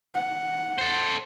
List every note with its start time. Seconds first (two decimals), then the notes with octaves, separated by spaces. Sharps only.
0.15 F#5
0.78 A4 C5